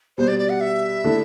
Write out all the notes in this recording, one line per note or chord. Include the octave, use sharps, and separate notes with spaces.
B2 G3 B3 C5
D5
D5
F#5
E5
D3 A3 E4